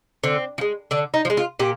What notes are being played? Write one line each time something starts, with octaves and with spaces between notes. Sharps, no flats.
D3 C4
F3
G#3
D3 D4
D#4
F3
G#3
F4
A#2 G4